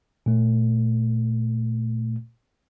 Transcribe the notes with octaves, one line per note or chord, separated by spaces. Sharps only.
A#2 A3